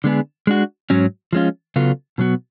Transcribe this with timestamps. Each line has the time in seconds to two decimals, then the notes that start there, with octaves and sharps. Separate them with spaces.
0.04 D3 G#3 B3 D4 G#4
0.47 G#3 D4 F#4
0.90 G#2 F#3 C#4
1.33 F3 G#3 C#4 F4
1.76 C#3 F#3 B3 F4 A4
2.18 B2 F#3 B3 F#4